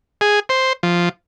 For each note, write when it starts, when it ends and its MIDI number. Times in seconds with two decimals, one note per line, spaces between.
0.21 0.40 68
0.49 0.73 72
0.83 1.09 53